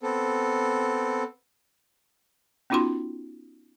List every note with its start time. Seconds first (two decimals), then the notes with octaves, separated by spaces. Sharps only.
0.03 B3 C4 A4
2.70 B3 C#4 D#4 F4 F#4 C6